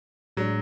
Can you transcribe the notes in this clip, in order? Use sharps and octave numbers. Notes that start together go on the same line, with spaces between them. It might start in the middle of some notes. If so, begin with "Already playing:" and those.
A2 F#3 G#3 D4